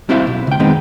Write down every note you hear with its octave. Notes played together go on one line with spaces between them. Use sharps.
G3 C4 E4 C5 E5 F5
B1
C#2 G5
F2 D#3 G#3 B3 C4